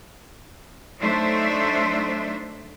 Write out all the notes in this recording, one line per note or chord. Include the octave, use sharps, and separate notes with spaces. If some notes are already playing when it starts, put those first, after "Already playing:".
F#3 A3 D4 D#4 C5 E5